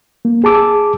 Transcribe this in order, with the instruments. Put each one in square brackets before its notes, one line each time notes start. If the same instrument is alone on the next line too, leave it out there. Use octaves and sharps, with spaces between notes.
[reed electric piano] A#3
G#4 A5 D6 E6